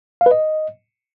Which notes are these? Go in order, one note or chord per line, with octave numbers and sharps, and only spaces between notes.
F5
B4
D#5